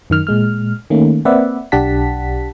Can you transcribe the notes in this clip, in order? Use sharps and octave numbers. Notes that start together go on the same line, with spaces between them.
F#2 D#3 F6
A#2 G#3 F6
D#3 A3 A#3 C#4
A#3 C4 B4 D5 E5 F#5
B1 D4 G4 F#5 A5 B6